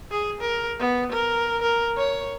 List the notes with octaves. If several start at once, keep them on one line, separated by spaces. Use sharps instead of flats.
G#4
A#4
B3
A#4
A#4
C#5